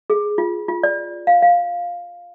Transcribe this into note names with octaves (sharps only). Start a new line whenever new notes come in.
G#4
F4
F4
D5
F5
F5